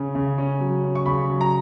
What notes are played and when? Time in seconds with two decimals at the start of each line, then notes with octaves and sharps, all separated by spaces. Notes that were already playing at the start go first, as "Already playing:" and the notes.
Already playing: C#3 C#4
0.15 C#3
0.38 C#4
0.60 F#3
0.84 C#4
0.95 C#6
1.06 C#3 B5
1.30 F#3
1.41 A#5